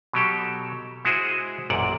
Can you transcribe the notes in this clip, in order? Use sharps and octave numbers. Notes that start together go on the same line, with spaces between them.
B2 F#3 G4 A4
G#3 E4 F#4 G#4 C5
A1 F#2 A#2 D5 F#5